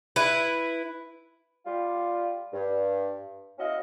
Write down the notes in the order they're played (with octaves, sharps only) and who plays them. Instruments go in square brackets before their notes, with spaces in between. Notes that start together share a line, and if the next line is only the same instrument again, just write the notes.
[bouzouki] E4 B4
[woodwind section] G3 F4
G2
B3 C#4 E4 F#4 D#5 F5